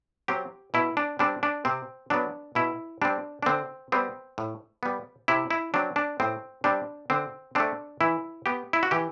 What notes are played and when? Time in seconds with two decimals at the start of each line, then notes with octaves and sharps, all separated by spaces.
0.28 F#3 C4 G4
0.74 B2 E4
0.97 D4
1.19 G3 C4 D4
1.43 D4
1.65 C3 C4
2.10 F#3 B3 D4
2.55 B2 E4
3.02 G3 C4 D4
3.43 D4
3.46 D3 C4
3.92 G3 B3 C4
4.38 A2
4.83 G3 B3
5.28 C3 E4
5.51 E4
5.74 F#3 C4 D4
5.96 D4
6.20 A2 C4
6.64 G3 C4 D4
7.10 D3 C4
7.55 A3 C4 D4
8.01 E3 E4
8.46 B3 G4
8.73 E4
8.83 F#4
8.91 E3 G4